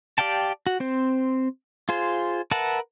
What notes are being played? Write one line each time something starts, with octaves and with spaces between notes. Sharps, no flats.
G4 D5 F5 G5 A5
F#4
C4 C5
F4 G#4 C5
A#4 B4 E5 F#5 A5